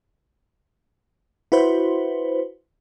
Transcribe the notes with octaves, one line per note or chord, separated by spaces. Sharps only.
E4 F#4 B4 C5